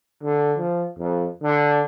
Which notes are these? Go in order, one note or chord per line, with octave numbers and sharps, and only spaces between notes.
D3
F3
F2
D3